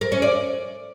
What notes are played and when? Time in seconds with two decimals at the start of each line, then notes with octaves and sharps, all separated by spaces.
0.01 A#4
0.12 C#4
0.22 D5